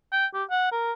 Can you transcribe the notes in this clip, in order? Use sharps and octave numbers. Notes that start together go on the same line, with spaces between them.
G5
G4
F#5
A#4